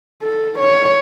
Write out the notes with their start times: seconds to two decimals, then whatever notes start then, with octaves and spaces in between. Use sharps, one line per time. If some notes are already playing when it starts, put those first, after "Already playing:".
0.23 A4
0.59 C#5